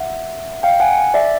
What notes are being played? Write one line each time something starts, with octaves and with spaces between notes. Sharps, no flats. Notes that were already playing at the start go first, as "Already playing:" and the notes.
Already playing: E5 F#5
F5 G5
F#5 G#5
D5 E5